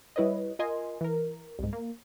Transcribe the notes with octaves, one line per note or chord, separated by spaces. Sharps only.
G3 E4 B4 C#5 D#5
F4 A#4 D#5 G#5 C6
E3 A#4
C2 G#2
A#3